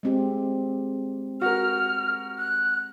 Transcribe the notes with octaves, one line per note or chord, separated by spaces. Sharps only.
G#3 C4 G4
F#4 A#4 F6
F#6